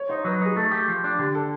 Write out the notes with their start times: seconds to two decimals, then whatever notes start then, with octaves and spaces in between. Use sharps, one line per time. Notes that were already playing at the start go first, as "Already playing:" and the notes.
Already playing: C#5
0.09 D#4 C5
0.24 F#3 B4
0.41 D#4 G#4
0.56 A3 A4
0.72 G4
0.88 F3
1.04 D4
1.19 D3 G4
1.35 A4